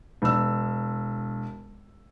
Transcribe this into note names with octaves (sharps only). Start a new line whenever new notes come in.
E1 E6